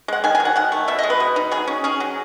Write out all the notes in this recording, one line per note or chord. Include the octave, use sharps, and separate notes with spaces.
G#3 F#5
D#3 G#5
G#5
F#3
F#5
D#3 F#5
A3
B2 E5
D#5
G#3
B4
B2
D#4
F#3 G#4
C#4
C#4 G#4
F#3